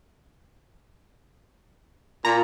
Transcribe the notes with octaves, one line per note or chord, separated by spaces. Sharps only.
A#2 A#5